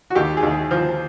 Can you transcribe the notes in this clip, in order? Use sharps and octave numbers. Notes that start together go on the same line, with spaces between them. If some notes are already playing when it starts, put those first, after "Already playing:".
F#4
D#2 G4
G#4
D#2
F3